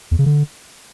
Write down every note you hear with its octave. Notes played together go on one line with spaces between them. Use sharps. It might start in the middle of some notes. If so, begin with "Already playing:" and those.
E2
C#3
D3